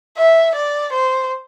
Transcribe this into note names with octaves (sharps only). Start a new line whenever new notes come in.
E5
D5
C5